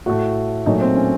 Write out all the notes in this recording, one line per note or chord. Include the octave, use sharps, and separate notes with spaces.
A2 A3 F#4
A#2 F#3 A3 D#4
C4
C#4